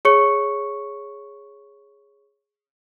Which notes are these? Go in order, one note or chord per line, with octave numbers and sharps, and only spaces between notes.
G#4 C#5 C#6 C#7